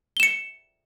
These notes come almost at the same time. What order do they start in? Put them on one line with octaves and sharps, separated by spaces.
G7 E7 C#7